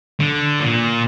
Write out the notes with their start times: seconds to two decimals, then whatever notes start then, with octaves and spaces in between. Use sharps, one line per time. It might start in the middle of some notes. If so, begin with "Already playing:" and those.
0.20 D3
0.60 A#2